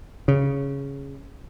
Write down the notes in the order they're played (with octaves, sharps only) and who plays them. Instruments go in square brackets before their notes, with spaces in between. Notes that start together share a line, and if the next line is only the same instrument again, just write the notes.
[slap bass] C#3